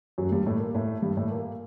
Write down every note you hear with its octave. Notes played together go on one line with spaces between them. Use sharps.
F#2 F#3
G2 G3
A2 A3
A#2 A#3
A2 A3
G2 G3
A2 A3
A#2 A#3